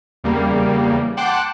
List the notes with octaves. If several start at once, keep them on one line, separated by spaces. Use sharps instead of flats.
E2 C#3 G3 A#3
F#5 G5 A5 C6 D6 F#6